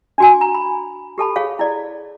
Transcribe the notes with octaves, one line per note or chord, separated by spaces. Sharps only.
D4 F#4 G#5
A#5
B5
G4 A4 A5 B5
G#4 C#5 F5
E4 D5